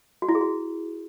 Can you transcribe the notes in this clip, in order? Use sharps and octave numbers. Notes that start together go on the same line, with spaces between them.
F#4
E4
G#4
F#4